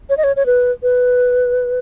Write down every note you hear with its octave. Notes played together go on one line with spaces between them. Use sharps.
C#5
D#5
C#5
C#5
B4
B4